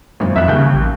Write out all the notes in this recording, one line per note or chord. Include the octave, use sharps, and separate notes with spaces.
G#1 F#2 A#2
F2 E5 F#6
D#2 C#3 G3 C#4 G6
A1